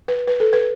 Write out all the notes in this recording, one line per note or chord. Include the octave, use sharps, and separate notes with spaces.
B4
B4
A4
B4